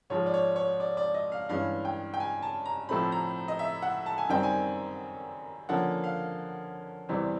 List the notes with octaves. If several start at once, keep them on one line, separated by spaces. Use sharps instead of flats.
G#2 F3 G#3 C#5
D5
C#5
C#5
D5
D5
D#5
F5
G2 E3 G#3 C#4 F5
G5
G5
G#5
A5
A#5
A2 F3 A3 C4 B5
A#5
D#5
E5
F#5
A5
G#5
F#2 D#3 G3 C4 G5
G#5
D3 F3 A#3 C#4 F#5
F5
E2 C3 E3 G3 C4